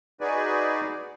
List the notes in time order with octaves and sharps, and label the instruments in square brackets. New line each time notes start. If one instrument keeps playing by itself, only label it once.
[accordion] D#4 F#4 G#4 B4 D5 G#5